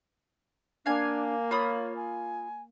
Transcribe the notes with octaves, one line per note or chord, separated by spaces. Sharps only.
A#3 D4 F5 G#5
F4 C#5 B5 D#6
G#5